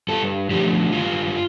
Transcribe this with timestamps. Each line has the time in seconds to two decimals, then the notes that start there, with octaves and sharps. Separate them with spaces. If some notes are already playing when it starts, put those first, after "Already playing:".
0.08 G2 A4
0.51 D3 F3 A3 G4
0.92 G2 F4